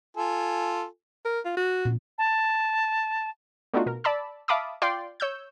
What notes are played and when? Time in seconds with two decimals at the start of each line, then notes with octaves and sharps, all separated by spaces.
0.17 F4 A4 G#5
1.25 A#4
1.45 F4
1.57 F#4
1.85 A#2
2.18 A5
3.73 A3 B3 D4 D#4 F4 F#4
3.86 B2 A#4
4.04 D5 A5 B5 E6
4.48 E5 F5 A5 B5 D6 D#6
4.82 F4 D5 G5 C6
5.20 C#5 E6 G6